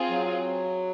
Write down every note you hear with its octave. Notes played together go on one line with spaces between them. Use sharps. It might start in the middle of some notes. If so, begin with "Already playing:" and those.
Already playing: C4 F4 G#4
F#3